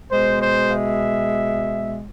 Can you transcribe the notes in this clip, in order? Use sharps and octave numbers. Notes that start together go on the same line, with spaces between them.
B2 G#3 C5
C5
E5